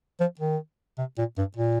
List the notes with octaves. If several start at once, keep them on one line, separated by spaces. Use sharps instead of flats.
F3
D#3
C3
A#2
G2
A#2